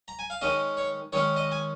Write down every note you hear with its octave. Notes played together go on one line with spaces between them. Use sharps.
A#5
G#5
F5
D#3 G#3 C#4 D#5
C#5
D#3 G#3 C#4 C#5
D#5
G#5